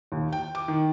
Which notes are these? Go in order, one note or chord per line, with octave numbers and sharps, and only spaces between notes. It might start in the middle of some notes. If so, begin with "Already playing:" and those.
D#2
G5
D6
D#3